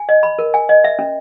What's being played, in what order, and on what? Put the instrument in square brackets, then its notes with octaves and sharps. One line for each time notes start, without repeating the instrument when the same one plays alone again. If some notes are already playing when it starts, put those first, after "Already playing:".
Already playing: [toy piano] G#5
D#5
B5
A#4
G#5
D#5
E5
C#4